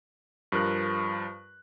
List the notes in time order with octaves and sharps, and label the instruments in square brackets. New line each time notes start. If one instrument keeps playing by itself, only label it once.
[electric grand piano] G2 F3 A#4 F#6